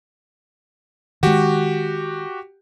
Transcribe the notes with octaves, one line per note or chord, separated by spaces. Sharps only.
D#3 G#3 F#4 G4